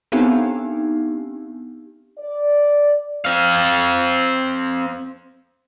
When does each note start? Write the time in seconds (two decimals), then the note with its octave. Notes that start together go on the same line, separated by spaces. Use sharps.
0.12 B3 C4 D4 D#4 G4
2.19 D5
3.25 C4 F5